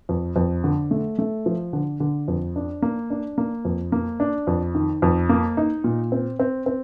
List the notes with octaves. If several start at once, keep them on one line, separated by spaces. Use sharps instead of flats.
F2
F2
D3
A3
A3
F3
D3
D3
F2
D4
A#3
D4
A#3
F2
A#3
D4
F2
D#3
F2
A#3
D#4
A#2
C4
C4
C4